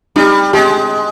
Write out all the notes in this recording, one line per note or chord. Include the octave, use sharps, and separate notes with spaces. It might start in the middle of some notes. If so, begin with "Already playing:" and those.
G3 D#4
G#3 G4